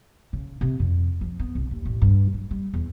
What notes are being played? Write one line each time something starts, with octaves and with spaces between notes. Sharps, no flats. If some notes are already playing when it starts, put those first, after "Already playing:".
C#3
C3
F2
F3
B3
C2
D#2
A1
G2
F#3
G3
E2